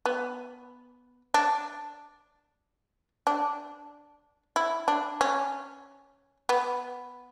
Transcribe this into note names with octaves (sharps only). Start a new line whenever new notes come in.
B3
D4
D4
E4
D4
C#4
B3